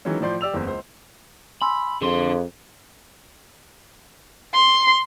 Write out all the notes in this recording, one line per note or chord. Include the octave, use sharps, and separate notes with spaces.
D#3 E3 F#3 G#3 C#4
A2 F3 D5 C6 G6
G4 D5 E6 F7
F#1 E2 C4
C#2 C5
G#5 B5 C6 E6
F2 D3 G#4 C6
C6